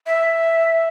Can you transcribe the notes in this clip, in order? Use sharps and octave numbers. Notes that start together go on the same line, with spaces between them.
E5